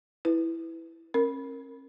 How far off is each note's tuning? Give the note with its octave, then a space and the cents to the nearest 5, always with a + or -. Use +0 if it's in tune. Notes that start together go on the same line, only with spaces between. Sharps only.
E4 +0 B4 +0
C#4 -40 A#4 +0